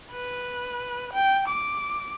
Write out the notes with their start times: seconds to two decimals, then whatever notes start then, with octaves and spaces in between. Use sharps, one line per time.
0.12 B4
1.14 G5
1.49 D6